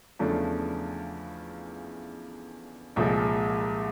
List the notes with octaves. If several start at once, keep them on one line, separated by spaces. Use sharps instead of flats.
E2 C#3 F3 A3 D4
C2 A#2 F3 G#3